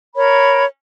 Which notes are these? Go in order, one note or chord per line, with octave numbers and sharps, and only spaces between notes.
A#4 C#5 B5